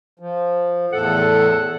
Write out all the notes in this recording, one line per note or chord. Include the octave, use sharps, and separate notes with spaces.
F3
E2 A2 A4 F#5